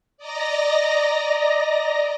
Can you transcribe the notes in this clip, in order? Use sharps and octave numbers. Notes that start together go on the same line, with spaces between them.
D5 D#5 A#5 A#6